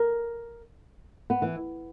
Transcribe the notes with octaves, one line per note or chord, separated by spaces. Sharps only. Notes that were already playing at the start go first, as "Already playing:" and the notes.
Already playing: A#4
B3
E3